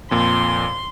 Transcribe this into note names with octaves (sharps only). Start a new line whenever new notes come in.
F2 A#2 C6